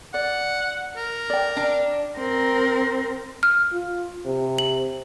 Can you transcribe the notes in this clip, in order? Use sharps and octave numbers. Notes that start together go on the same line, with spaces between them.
D5 F#5
A#4
D5 G5
D4
C4 A#4
F6
F4
C3
F#7